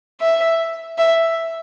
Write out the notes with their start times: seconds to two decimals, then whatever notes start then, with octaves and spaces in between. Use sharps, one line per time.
0.21 E5
0.98 E5